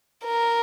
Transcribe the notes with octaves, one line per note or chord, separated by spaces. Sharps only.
A#4